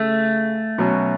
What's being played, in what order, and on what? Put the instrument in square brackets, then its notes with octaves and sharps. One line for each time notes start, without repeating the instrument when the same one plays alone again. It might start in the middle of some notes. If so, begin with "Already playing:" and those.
Already playing: [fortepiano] C#3 [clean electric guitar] A3
[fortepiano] B2 F#3 C#4